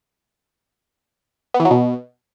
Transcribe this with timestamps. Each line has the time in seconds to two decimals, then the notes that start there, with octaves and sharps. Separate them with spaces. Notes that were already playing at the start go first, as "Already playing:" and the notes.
1.54 B3
1.60 E3
1.65 F#3
1.71 B2